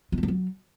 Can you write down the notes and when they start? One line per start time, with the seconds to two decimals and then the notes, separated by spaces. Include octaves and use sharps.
0.12 G#3
0.18 F#3
0.23 G3
0.28 F#3